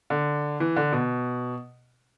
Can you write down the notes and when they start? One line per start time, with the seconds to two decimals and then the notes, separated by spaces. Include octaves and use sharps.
0.10 D3
0.60 E3
0.77 D3
0.92 B2